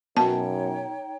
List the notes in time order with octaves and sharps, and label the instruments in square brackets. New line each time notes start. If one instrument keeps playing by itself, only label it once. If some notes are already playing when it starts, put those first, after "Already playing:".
[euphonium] F#2 [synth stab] B2 [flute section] D#4 C#5 G5 [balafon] A5